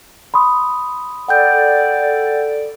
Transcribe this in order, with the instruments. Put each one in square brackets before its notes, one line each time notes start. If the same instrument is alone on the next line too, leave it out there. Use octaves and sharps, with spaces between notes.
[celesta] B5 C6 D#6
[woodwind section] A4 D5 [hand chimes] F#5 G5 G6